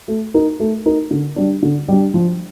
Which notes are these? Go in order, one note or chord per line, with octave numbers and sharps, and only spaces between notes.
A3
D#4 A#4
A3
D#4 A#4
D3
G3 D4
D3
G3 D4
F3